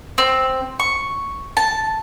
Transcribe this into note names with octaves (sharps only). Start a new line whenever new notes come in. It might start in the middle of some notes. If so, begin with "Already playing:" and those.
C4
C#6
A5